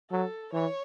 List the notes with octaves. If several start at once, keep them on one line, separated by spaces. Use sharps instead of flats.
F#3 A4
E3 C#5